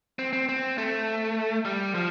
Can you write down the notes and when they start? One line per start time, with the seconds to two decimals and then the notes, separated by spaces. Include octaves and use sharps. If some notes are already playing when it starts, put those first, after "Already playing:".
0.19 C4
0.33 C4
0.49 C4
0.78 A3
1.65 G3
1.95 F3